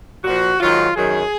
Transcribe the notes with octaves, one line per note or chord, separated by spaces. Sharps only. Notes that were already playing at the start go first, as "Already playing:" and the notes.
A#2 F3 F#4
G#2 D#3 F#3 F4
F#2 D#3 F#3 G#4